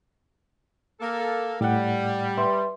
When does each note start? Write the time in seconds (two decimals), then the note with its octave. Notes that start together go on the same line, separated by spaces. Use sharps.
1.00 A#3 A4
1.61 A2 G3 F#5
2.37 B4 E5 C6